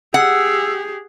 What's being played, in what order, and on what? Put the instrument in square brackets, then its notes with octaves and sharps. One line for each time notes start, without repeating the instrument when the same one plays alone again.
[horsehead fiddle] G4 G#4 [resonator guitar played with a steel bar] F#5 [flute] E6